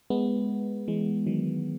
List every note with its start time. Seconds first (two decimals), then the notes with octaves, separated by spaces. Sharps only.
0.10 G#3 B3
0.88 E3 G#3
1.26 D#3 F#3